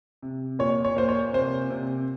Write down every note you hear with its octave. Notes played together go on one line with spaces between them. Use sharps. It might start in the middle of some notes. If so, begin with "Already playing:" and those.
C3
A#2 C#5
C#5
A#2 C5
C#5
C3 C5
C3